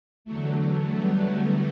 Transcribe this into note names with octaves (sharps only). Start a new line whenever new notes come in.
E2 D3 F#3 A3
G3 B3
F#3 A3